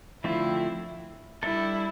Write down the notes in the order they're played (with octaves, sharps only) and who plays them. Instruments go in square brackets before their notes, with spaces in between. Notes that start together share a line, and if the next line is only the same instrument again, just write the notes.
[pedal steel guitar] D3 F3 A3 C4 F4 [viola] E4
[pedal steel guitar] G3 D4 A4 [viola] E4